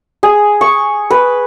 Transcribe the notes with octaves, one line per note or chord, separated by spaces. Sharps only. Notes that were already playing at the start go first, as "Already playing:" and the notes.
G#4
C#6
B4